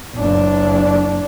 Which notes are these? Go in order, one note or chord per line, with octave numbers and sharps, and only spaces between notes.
F#1 D4